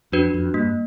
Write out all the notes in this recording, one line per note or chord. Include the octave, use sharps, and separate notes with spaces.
F2 D4 F#4 B4
F2
G2 A#3